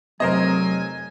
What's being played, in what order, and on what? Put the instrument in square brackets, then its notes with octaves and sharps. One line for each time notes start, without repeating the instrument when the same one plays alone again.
[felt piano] F1 [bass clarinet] F#3 [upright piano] A#4 C5 D#5 [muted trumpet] G#5